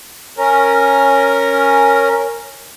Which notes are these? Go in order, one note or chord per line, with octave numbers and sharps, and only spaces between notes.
C#4 A#4